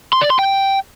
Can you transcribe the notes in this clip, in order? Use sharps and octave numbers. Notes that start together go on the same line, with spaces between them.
C6
D5
C6
G5